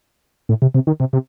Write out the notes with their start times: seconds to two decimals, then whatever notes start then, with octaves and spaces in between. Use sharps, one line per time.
0.49 A2
0.62 C3
0.74 C3
0.87 D#3
1.00 C3
1.13 C3